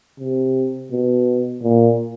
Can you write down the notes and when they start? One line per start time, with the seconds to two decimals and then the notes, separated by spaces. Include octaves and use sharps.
0.20 C3
0.92 B2
1.63 A#2